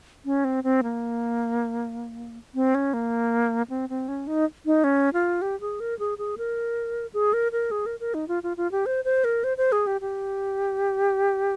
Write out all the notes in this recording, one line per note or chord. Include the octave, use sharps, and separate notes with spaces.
C#4
C4
C4
A#3
C4
C#4
A#3
C4
C4
C#4
D#4
D#4
C#4
F4
G4
G#4
A#4
G#4
G#4
A#4
G#4
A#4
A#4
G#4
A#4
A#4
D#4
F4
F4
F4
G4
C5
C5
A#4
C5
C5
G#4
G4
G4